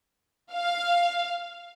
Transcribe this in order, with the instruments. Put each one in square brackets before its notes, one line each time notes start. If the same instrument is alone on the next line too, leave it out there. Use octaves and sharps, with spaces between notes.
[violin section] F5